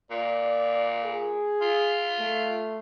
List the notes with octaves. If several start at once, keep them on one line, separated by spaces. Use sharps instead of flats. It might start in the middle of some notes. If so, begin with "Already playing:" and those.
A#2 D5
G#4
F4
A3